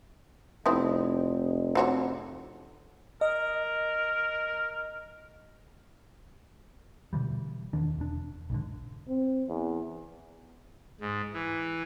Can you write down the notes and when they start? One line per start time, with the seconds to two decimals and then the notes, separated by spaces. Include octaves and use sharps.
0.66 F1 B3 C4 E4
1.75 C4 F#4 C#5
3.21 A#4 D#5
7.13 B2 D3 E3 G3
7.73 E2 D#3 D4
7.98 E1 D4
8.50 B1 G#2 D3
9.08 C4
9.48 E2
11.00 G#2
11.33 E3